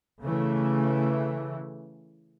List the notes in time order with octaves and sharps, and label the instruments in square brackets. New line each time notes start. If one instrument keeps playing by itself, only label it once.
[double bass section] C#3 E3 A3